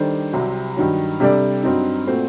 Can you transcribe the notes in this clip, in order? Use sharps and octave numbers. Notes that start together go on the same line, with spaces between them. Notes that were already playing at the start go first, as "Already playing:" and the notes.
Already playing: D#3 G3 D4 A4 C5
C2 C3 F#3 C4
G2 D#3 F#3
C3 G3 D4 A4 D5
G2 F#3 C4 D#4
A#2 A3 C4 F#4 C5